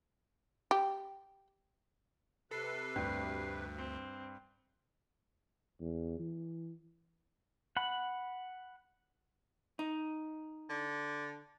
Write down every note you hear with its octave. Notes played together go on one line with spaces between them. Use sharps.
G4
C3 A4 B4 C7
D2 G2
C4
E2
E3
F#5 B5
D#4
D3